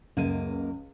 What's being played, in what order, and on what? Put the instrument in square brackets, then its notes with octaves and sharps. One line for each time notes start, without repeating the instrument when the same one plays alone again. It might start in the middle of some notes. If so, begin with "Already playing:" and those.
[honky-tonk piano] C#2 D#7 [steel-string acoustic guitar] F#2 A#3